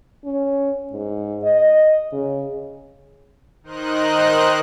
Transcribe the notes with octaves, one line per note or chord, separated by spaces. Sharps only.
C#4
G#2
D#5
C#3
D#3 D#4 A#4 C5 D#5 F#6